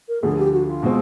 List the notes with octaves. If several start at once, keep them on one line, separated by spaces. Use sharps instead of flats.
A#4
D2 D3 F3 G#4
G4
F#4
F4
B2 G#3 C4